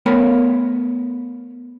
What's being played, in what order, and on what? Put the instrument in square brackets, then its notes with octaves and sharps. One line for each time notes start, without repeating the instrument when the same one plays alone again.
[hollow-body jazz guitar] A3 B3 A#4 C#5 B5